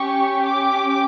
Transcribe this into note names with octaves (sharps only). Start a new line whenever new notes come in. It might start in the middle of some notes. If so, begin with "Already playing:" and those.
Already playing: C#4 G4 C#6
D6